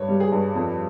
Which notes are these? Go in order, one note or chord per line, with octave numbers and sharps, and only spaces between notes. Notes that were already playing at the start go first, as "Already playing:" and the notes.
Already playing: G2 C#5
G3
G#4
G2
F2